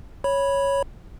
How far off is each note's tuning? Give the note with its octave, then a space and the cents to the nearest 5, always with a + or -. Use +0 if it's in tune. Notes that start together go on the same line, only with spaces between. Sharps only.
C#5 +0 B5 -10